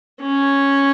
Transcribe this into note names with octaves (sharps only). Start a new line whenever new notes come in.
C#4